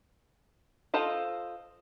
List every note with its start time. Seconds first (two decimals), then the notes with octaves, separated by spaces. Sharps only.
0.94 F4 A4 C5 D#5